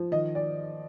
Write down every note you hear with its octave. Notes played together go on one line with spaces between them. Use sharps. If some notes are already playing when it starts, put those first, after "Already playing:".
Already playing: F3
D#3 D#5
D5